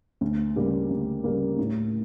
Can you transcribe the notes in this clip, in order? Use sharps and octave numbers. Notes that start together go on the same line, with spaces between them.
D2
C#3 G3 A#3
D2
C#3 G3 A#3
A2